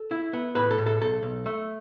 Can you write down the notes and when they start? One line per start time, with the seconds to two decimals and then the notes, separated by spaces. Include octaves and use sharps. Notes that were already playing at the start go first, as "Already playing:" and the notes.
Already playing: A4
0.11 E4
0.33 B3
0.55 A2 B4
0.71 A4
0.78 A2
0.86 A4
1.01 B1 A4
1.23 B1
1.46 A3